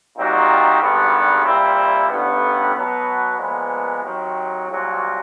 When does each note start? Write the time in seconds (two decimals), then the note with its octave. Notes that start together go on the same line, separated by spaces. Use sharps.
0.15 A#2 G3 C4 D#4 F#4
0.79 G#1 G2 D3 G3 B3
1.44 A#2 G3 C4 E4
2.08 A1 G2 D3 G3 B3
2.73 B2 F#3 B3
3.37 A#2 F3 G#3 B3
4.02 C3 D#3 F#3
4.67 C2 A#2 F#3